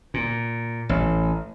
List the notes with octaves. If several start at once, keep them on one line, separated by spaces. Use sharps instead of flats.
A#2
A1